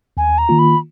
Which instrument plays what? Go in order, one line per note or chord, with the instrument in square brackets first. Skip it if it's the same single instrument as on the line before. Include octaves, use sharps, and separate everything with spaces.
[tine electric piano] D#2 [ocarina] G#5
[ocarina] A#5
[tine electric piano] D#3 A#3 F4
[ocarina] B5